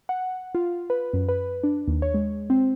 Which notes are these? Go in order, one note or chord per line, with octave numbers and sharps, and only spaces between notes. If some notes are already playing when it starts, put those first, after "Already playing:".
F#5
F4
B4
F#2
B4
D4
D#2
C#5
G#3
C4